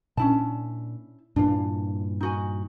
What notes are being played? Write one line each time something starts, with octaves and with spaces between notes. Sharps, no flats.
A#2 C#4 D4 E4 A5
G2 A#2 E3 D4 F4
D#4 F#4 G#5